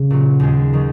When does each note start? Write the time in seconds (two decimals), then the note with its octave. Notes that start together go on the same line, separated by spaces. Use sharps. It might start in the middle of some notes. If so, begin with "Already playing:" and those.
Already playing: C#3
0.10 A#2 F#3
0.40 D#2 D#3 G#3
0.73 D#3 F#3